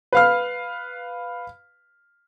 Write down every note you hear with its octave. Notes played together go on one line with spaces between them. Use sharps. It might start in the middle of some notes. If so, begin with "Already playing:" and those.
B4 F5 F6